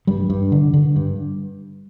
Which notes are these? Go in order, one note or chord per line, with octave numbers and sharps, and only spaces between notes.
G2 G3
G2
D3
D3
G2